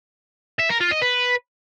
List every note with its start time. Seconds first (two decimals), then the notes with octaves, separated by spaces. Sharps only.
0.60 E5
0.70 A#4
0.81 F4
0.91 D#5
1.02 B4